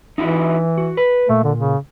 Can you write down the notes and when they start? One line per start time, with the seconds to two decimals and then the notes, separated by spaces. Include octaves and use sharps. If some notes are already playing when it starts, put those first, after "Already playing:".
0.18 E3 D#4 E4 F#4
0.78 F#4
0.97 B4
1.29 A#2 A3
1.44 D3
1.58 C#3